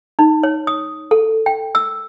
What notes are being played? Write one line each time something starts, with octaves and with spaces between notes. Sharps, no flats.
D#4
C#5
D#6
A4
G5
E6